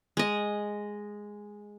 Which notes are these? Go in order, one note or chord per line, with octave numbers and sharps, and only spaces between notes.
G#3 D#5